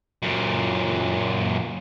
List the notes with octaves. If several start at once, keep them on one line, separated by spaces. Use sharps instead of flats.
F#2 A#2